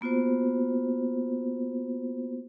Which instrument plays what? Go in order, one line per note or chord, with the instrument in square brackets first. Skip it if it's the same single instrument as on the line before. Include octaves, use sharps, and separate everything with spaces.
[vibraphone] A#3 B3 F4 F#4 C5